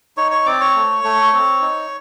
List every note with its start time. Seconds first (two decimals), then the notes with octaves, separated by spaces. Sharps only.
0.17 D#4 C#5 C#6
0.31 C#5 C#6
0.46 C4 D5 D6
0.60 C#5 C#6
0.75 A3
1.04 A3
1.33 C4
1.61 D#4